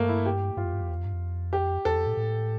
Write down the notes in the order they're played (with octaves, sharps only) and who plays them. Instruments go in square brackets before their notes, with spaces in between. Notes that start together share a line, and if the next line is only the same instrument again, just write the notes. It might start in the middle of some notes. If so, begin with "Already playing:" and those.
Already playing: [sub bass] G2 [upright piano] A3 A#3
[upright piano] E4
G4
[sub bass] G2 [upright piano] F4
[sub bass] F2
G2
F2
E2
F2
G2
F2
[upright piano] G4
[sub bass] E2 [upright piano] A4
[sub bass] F2
A2
A2